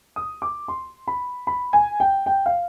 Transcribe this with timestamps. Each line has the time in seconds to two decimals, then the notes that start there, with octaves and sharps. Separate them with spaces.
0.16 D#6
0.42 D6
0.68 C6
1.08 B5
1.47 B5
1.73 G#5
2.00 G5
2.26 G5
2.46 F5